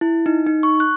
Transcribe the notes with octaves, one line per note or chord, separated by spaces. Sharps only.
E4
D#4
D#4
C#6
F#6